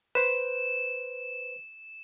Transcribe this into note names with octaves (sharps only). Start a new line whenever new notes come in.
B4 C5 E7